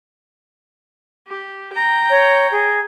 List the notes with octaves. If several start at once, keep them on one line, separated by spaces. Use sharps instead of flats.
G4
G5 A#5
C#5
G#4